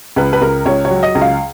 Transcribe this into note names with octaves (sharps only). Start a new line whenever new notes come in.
C#2 B4
B4
C#2 A#4
C#2 C#5
C#5
F#3
D#5
C#2
F5